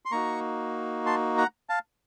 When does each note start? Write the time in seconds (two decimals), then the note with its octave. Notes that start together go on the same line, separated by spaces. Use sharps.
0.05 C6
0.12 A#3 D#4 F#4 A#5 C#6
1.06 A5 C6
1.37 F#5 A#5
1.69 F5 A5